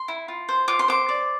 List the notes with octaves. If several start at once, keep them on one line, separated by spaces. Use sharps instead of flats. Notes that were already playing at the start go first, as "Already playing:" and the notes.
Already playing: C6
E4
F4
C5
F4 D6
C6
C5 D6
D5